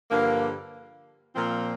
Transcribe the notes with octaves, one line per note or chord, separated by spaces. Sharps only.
G2 D3 F3 A#3
A#2 F3 C4